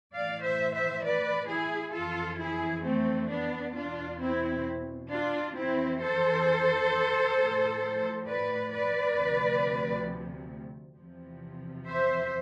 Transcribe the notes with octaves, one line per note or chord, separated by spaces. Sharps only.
A2 E3 D5 F5
C5 E5
C5 E5
B4 D5
E4 G#4
F2 E3 F4 A4
E4 G#4
A3 C4
B3 D4
E2 B2 D4 F4
C4 E4
D4 F4
F2 E3 C4 E4
A4 C5
A2 F3
B4 D5
B4 D5
D2 C3 F3
E2 C3 F3
C5 E5